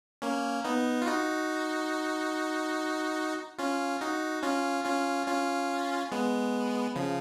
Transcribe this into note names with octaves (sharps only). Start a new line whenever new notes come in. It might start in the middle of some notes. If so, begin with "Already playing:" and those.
A#3 C#4
B3 D#4
F4
D#4 F#4
C#4 F4
D#4 F#4
C#4 F4
C#4 F4
C#4 F4
G#3 B3
C#3 F3